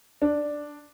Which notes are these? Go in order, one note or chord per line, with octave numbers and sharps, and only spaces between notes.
D4